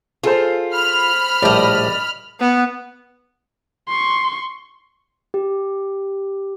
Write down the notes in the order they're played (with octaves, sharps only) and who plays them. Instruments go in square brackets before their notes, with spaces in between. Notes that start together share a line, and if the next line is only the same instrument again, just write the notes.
[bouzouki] F4 [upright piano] G#4 A4 C5
[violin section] B5 F6
[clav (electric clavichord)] A#1 A2 G3 [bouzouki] D5 D#5
[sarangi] B3
[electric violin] C6 C#6
[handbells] G4